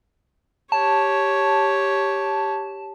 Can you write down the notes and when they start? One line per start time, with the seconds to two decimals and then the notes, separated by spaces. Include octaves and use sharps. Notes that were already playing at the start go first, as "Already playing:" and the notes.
0.72 G4 C#5 A5